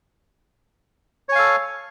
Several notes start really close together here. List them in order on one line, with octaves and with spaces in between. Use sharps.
C#5 G#5 F5 A4